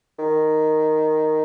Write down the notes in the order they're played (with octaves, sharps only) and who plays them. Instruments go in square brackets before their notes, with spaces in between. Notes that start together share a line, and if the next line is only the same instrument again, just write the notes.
[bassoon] D#3